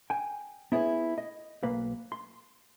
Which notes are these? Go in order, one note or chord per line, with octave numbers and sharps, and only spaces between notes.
G5 G#5
B3 E4 G#4 B4 C#5
D#5
B1 A#3 B4 F5
C6